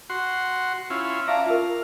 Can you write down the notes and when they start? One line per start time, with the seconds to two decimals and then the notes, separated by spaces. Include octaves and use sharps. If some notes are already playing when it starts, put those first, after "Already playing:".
0.10 F#4 C6
0.90 C#4 E4 F4
1.28 D5 E5 F5 A5 A#5
1.46 F4 A#4 F5